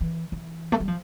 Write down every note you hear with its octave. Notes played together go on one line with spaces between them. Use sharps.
E3
E3
A3
G3
F3